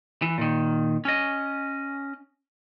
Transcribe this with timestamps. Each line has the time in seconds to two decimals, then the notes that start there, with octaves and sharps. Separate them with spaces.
0.22 E3
0.38 A#2 D#3
1.05 C#4 D#5